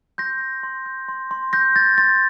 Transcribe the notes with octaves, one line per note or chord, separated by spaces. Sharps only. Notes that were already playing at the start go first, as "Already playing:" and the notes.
C6 G6 A#6
G6
C6
G6
C6
C6
G6 A#6
G6 A6
C6 A6